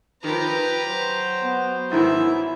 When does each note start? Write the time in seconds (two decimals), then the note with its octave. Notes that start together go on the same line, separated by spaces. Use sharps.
0.24 D#3 F3 G4 B4 A#5
0.85 F#3 C5
1.43 B3
1.91 G#2 D#3 E3 E4 E5